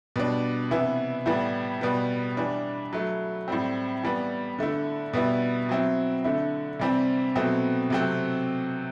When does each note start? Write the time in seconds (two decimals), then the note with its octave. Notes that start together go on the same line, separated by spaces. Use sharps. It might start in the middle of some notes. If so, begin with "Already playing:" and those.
0.16 B2 G3 D4
0.71 C3 E3 B3 E4
1.26 A2 E3 G3 B3
1.81 B2 G3 B3
2.37 E3 G3 D4
2.93 F#3 A3 E4
3.48 A2 G3 C4
4.03 E3 G3 B3
4.59 D3 A3 E4
5.13 B2 G3 B3 E4
5.69 F#3 C4 E4
6.24 D3 A3 E4
6.80 C3 E3 G3 C4
7.35 B2 F#3 A3 C4
7.90 C3 F#3 A3 C4